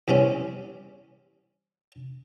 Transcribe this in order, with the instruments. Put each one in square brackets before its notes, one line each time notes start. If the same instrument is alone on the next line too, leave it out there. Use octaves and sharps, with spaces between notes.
[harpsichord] E2 G3 C4 C#4